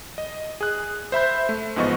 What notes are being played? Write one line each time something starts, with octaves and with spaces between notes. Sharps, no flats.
D#5
G#4 F#6
C5 E5 B5 G6
A3
A1 G#2 F3 B3 D#5 C#6